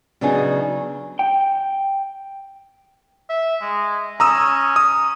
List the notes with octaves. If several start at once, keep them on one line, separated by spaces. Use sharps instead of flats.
C#3 F#3 B3 D4 D#4 G#4
G5
E5
G#3
C#4 A#5 D#6 E6
D#6